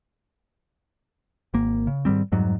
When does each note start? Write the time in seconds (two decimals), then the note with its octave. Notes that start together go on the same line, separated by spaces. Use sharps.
1.54 G#1 A#3
1.87 C#3
2.05 G#2 D#3 G3 C4
2.32 F2 G#2 F#3 G3